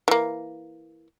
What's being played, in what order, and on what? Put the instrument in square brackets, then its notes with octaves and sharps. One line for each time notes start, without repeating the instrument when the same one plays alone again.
[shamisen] E3 A#3